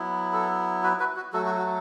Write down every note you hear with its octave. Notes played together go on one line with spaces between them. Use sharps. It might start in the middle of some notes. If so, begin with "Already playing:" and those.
Already playing: F#3 B3 E4
A4
F#4 B4
F#4 B4
F#4
F#3 A3 F#4 A4
F#4
F#4